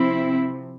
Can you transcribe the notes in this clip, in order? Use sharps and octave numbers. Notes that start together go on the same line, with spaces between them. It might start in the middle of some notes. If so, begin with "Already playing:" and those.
Already playing: C3 F3 C4 E4